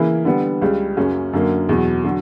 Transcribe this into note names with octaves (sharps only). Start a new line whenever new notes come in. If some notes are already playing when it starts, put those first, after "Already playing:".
Already playing: C#3 E3 A#3 E4
D3 G3 B3
C#2 C#3 G3
F#2 C#3 F#3 C#4
F#2 D3 F#3 A#3
E2 B2 F#3
D3 F#3